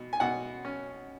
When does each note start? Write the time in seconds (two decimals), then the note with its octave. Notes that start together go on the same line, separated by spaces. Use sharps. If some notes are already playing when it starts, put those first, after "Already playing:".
Already playing: B2
0.13 G#5
0.20 B2 F#5
0.65 C#4